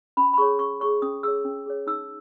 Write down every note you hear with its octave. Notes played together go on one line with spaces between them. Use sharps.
C#4 B5
B5
G#4 C#5 C#6
C#4 C#6
G#4 C#5 C#6
C#4 D#6
G#4 C#5 E6
C#4
G#4 C#5
D#4 E6